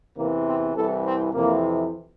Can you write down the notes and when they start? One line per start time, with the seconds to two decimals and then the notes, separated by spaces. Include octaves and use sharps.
0.17 E2 C3 E3 A#3
0.47 C4
0.75 C2 C3 E3 A4
1.05 C4
1.33 F2 C3 E3 A#3